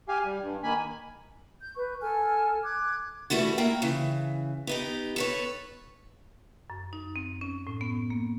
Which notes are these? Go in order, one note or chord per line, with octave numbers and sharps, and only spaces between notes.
G4 F5 G#5
G3
G2
D#3 A#3 G#5 B5
G6
B4 C#6
A4 G#5 A5 F6
D6 F#6 G#6
E3 G3 A3 E4 F#4
A#3 E4 G5
C#3 E3
B3 D#4 G4
A4 B4 C#5
F#2
D#4
C4
C#4
A2
B3
A#3